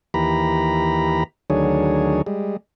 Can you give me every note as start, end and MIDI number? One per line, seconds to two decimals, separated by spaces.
0.14 1.24 39
0.14 1.24 52
0.14 1.24 67
0.14 1.24 82
0.14 1.24 83
1.50 2.22 38
1.50 2.22 51
1.50 2.22 54
1.50 2.22 62
1.50 2.22 68
1.50 2.22 73
2.26 2.57 55
2.26 2.57 56